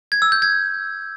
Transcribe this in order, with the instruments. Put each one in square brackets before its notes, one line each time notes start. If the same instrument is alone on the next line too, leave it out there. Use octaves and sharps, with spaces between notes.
[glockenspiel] G#6
E6
G6
G#6